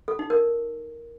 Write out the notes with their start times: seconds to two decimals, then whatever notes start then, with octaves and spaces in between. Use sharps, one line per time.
0.08 A4
0.19 D#4
0.30 A#4